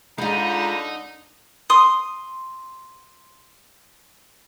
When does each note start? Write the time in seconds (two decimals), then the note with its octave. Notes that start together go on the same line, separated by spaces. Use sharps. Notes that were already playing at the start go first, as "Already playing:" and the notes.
0.18 D3 G#3 D#4 F4 A#5 B5 G6
1.70 C6 D#6